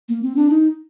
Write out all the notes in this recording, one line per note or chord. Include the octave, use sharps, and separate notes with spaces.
A#3
C4
D4
D#4